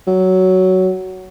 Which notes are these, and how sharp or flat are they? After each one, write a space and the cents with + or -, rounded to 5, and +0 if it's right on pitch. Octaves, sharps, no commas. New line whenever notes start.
F#3 +10